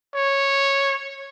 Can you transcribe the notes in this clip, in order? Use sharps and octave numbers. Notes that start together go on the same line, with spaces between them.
C#5